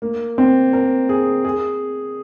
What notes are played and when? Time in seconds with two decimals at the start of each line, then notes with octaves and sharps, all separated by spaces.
0.02 A#3
0.38 C4
0.73 A#4
1.09 G#4
1.45 G#4